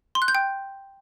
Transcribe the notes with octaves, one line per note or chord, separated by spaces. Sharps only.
C6
F#6
G6
G5